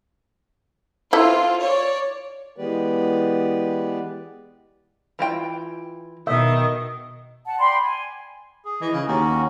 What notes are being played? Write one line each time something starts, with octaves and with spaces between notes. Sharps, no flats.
C4 E4 F4 A4
C#5 D5
E3 G#3 B3 G4 B4 D5
E3 F4 G5
B2 D#3 D#5 E5
F#5 A5
D5 G5 B5 C6
G#5
G#4
E3 D#5
C#3
D#2 C#4 F#4